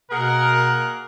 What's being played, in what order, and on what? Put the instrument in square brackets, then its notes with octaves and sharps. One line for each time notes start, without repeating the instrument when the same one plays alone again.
[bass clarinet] B2 [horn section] A#3 G#4 F#5 [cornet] A#4